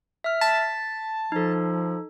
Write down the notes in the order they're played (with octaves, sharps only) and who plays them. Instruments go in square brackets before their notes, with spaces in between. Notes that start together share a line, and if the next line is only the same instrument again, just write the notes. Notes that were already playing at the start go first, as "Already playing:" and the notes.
[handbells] E5 F6
[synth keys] A5 [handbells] B6
[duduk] F3 [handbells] D#4 A4